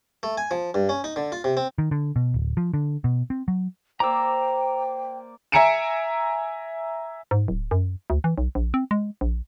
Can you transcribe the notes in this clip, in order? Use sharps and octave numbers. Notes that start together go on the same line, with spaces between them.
A3
G#5
F3
G2
C#4
D#4
D3
F4
C3
C4
D#3
D3
B2
D1
F3
D3
B2
C4
F#3
A#3 C5 D5 G5 A#5 E6
E5 G#5 A#5 C#7 D7 E7
G#2
D1
F#2
D2
E3
B1
A#1
C4
G#3
A#1